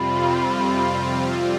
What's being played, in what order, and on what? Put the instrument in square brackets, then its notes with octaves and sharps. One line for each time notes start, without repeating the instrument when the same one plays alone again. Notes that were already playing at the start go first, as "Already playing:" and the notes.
Already playing: [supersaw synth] F2 C3 G3 C4 F4 [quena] B5
[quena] D5